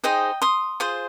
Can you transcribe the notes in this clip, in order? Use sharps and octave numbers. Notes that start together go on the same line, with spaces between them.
D#4 G#4 C5 D#5 G5
C6 D#6
F4 G#4 C5